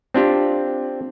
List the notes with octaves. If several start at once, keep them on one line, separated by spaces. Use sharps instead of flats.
C4 D4 F4 G4